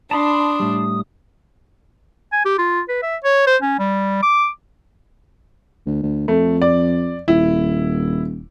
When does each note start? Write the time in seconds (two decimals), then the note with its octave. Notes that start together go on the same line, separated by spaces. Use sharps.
0.11 D4 A5 B5 C6 D#6
0.60 A2 G3
2.32 G#5
2.45 G4
2.58 F4
2.89 B4
3.03 E5
3.24 C#5
3.47 C5
3.62 C#4
3.79 G3
4.22 D6
5.86 D2
6.03 D2
6.28 F2 A3
6.62 D5
7.28 D#1 E4